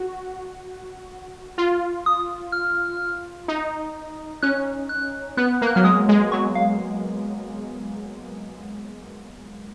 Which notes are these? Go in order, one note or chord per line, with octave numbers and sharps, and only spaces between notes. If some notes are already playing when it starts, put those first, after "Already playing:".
Already playing: F#4
F4
D#6
F6
D#4
C#4 F#6
F#6
B3 F#6
A#3
F#6
F#3 F6
G#3 D#6
G#3
F#3 C#6
F5